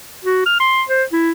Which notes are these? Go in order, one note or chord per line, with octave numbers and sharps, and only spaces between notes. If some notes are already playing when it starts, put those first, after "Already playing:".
F#4
F6
C6
C5
E4